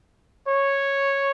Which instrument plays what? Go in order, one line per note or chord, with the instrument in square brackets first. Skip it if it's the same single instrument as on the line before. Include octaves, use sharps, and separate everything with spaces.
[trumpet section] C#5